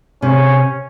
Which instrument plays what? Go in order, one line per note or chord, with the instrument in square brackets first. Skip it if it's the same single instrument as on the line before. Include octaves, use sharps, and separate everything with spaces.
[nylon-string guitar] C3 [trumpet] C#4